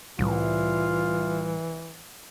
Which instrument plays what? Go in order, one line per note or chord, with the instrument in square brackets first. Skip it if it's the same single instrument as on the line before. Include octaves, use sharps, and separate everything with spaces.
[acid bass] C2 [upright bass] A2 G3 [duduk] E3 [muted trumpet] F4